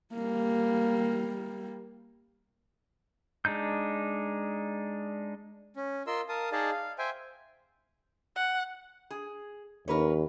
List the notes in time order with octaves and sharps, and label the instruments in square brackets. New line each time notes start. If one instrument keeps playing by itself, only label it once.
[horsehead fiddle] G3 A#3
[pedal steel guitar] G#3 D4 D#4 G6
[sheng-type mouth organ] C#4
F4 A#4 D#5 C6 E6
A#4 F5 A5 D#6
D#4 G#4 D5 D#5 F5 A5
F5
C5 E5 G5 G#5
[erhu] F#5
[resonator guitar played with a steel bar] G#4
[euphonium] D#2 [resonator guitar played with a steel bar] A#4 B4 C#5